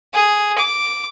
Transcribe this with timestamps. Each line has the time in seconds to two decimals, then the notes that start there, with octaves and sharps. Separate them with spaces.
0.14 G#4
0.58 D6